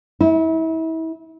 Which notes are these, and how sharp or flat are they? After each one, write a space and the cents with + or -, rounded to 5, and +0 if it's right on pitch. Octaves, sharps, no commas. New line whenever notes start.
E4 -35